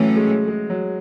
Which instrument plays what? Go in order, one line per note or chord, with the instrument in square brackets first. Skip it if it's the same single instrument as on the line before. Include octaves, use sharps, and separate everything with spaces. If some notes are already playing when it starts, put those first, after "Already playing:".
Already playing: [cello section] A2 E3 A3 C#4 [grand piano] F#3
[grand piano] G#3
G#3
F#3